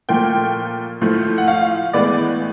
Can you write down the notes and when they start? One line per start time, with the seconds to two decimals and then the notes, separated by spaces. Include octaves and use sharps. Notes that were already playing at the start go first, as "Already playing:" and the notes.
0.09 A#2 F3 A3 G5
1.01 A2 F3 A3
1.38 F#5
1.48 F5
1.93 A2 E3 G#3 B3 D5